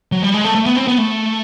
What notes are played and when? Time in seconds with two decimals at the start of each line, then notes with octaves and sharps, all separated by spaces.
0.12 F#3
0.23 G3
0.34 G#3
0.44 A3
0.55 A3
0.66 B3
0.76 C4
0.87 B3
0.98 A3